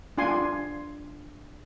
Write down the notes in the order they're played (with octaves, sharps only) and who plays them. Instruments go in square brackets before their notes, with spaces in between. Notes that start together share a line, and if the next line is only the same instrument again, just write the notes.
[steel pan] D4 F4 G#5 C6